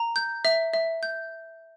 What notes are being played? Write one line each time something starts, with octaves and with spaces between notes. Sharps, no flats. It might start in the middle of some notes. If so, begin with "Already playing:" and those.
Already playing: A#5
G6
E5
E5
G6